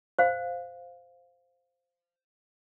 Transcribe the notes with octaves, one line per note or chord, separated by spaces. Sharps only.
C5 F5